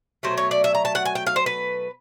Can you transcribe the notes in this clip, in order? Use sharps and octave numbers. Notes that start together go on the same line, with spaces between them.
B2 F#3 A3 C5
C#5
D5
E5
A#5
A5
F#5
G#5
G5
F5
C5
B4